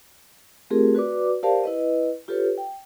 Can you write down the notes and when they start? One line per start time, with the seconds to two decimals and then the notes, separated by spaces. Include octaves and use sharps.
0.70 A3 C4 F4 G4 G#4 A#4
0.95 F#4 B4 D5 D6
1.43 G4 A#4 C5 D5 F5 A5
1.64 E4 B4 D#5
2.28 F4 G4 A4 B4 C#5
2.58 G5